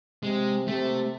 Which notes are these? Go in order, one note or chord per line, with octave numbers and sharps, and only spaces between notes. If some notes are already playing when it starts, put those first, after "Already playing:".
C3 G#3
C3 A3